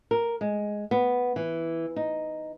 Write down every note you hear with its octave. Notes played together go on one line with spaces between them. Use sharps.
A#4
G#3
B3
E3
D#4